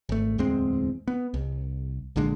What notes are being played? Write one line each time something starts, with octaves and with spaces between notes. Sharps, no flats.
G#1 A3
D1 E2 G#3 C4
B3
C2
A#1 A#2 D3 G#3